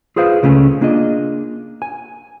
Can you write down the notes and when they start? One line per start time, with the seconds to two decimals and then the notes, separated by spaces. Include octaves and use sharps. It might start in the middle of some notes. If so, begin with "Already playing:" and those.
0.16 F4 G#4 B4 C5 F5
0.43 C#2 C#3 A3 C#4 G#4
0.81 A#3 D4 F4 G#4 D#5
1.82 G#5